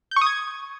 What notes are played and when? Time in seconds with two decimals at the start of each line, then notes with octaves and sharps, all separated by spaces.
0.11 G6
0.16 C#6
0.21 D#6
0.26 G#6